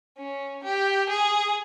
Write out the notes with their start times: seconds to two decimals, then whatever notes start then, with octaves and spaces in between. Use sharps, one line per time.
0.18 C#4
0.63 G4
1.09 G#4